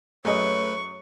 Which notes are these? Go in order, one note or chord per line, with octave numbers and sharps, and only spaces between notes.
F#2 A3 G#4 B4 C#5 D#5 C#6